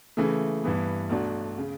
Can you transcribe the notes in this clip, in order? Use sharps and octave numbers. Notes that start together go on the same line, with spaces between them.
C#3 E3 A3
G2 E3 B3
B1 B2 A3 D4 F#4
C#3